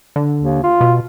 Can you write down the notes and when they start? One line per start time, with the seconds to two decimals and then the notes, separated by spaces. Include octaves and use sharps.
0.16 D3
0.40 D#2
0.63 F4
0.81 B2